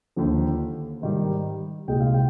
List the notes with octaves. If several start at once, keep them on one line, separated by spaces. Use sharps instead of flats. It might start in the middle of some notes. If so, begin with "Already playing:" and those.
D#2 D3 F3
G#2 D#3 G3
C2 A#2 G#3 G5
F5
G5